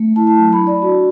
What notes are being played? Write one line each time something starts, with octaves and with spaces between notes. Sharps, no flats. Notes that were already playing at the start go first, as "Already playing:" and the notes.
Already playing: A3
E4 A5
A5
F#3
B5
D4
D5
F#4